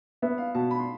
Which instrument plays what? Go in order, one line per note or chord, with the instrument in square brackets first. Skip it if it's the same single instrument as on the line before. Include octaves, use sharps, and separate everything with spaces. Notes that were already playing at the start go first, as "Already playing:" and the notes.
[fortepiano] B3 [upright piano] E5
[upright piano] F5
[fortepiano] B2 [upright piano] A5
[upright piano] B5
C6